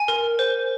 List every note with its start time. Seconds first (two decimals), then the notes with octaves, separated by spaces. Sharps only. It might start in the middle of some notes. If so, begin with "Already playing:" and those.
Already playing: G#5
0.08 A#4
0.39 C5